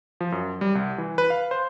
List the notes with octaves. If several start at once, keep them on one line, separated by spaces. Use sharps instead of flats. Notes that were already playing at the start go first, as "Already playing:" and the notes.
F3
F#2
G3
C2
E3
B4
F5
C5